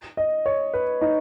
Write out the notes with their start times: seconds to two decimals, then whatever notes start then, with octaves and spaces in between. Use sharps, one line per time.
0.17 D#5
0.46 C#5
0.74 B4
1.01 D#4